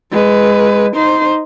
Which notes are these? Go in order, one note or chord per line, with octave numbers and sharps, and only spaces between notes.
G#3 B4
D#4 C5